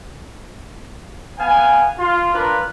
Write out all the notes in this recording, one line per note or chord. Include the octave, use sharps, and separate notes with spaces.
B3 F5 G#5
F4
D4 F4 A#4 B4